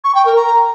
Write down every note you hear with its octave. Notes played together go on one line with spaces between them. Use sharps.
C#6
G5
A#4
A#5